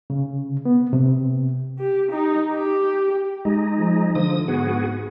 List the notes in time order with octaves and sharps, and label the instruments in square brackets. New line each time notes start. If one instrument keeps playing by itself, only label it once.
[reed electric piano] C#3
B3
C3
[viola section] G4
D#4
G4
[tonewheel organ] G#3 D#4
[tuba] F3
[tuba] D3 [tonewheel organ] F3 D#6
[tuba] G#2 [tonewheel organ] B3 F#4 G#4